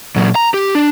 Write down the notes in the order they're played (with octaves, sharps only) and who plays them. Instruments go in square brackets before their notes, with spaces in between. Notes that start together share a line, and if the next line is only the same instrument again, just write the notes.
[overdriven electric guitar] A#2 F#3
A#5
G4
D4